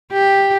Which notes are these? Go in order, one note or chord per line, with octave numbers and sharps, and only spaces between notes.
G4